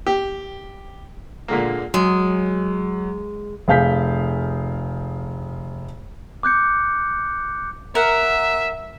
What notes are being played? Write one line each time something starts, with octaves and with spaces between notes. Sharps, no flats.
G4
A#2 D3 G#3 A#3
F#3 G#3
F1 G#4 F5 G6 B6
D6 F#6 G6 C#7
A#4 E5 F#5